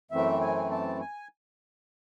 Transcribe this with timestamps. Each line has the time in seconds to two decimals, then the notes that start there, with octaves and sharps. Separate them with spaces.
0.11 F#2 E3 A3 C4 E5
0.41 G#5
0.71 A5
1.01 G#5